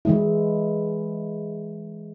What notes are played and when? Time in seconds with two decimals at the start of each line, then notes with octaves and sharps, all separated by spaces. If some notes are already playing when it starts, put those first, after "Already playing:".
0.05 E3 G#3 E4